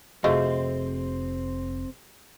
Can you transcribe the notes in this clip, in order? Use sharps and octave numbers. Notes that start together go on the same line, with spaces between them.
F1 A3 C4 F4 F#4 G#4 C5 D#5